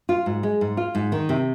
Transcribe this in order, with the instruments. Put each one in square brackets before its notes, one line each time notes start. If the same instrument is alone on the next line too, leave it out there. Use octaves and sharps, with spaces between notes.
[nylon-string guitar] F4
G#2
G#3
G#2
F4
G#2
D#3
C3